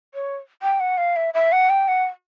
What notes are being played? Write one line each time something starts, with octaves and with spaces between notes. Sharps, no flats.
C#5
G5
F#5
F5
E5
E5
F#5
G5
F#5